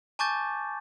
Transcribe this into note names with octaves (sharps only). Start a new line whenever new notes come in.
G#5 A5 C#6 D6 G6 A6